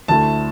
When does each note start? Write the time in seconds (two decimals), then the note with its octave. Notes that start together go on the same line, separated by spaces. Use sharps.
0.08 D2 D3 A3 E4 A5